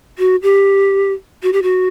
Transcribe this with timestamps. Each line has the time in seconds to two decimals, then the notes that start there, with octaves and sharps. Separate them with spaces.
0.19 F#4
0.42 G4
1.43 F#4
1.53 G4
1.63 F#4